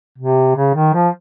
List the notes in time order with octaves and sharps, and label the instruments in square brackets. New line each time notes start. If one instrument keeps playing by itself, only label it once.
[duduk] C3
C#3
D#3
F3